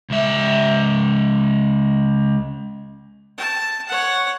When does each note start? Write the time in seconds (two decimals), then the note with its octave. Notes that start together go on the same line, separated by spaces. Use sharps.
0.10 C#2 E5
3.38 A5
3.88 C#5 F#5